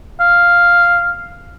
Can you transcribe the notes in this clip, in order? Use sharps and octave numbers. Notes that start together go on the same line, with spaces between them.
F5